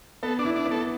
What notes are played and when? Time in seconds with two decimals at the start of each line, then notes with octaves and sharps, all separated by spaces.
0.23 B3 A4
0.39 D4
0.45 E4
0.56 D4
0.66 B3
0.71 A4